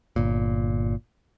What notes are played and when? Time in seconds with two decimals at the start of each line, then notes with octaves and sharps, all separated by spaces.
0.16 G1 A#2